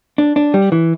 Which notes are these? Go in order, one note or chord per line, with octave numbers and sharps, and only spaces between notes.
D4
D4
G3
E3